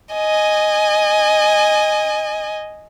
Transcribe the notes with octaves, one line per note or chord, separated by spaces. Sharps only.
D#5 G#5